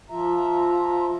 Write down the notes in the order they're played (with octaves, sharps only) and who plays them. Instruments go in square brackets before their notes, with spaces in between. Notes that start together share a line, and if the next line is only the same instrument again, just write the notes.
[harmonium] F3 E5 A#5 [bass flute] F4